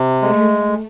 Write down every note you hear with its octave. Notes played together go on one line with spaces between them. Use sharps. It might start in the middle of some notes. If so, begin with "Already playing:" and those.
Already playing: C3
G#3 A3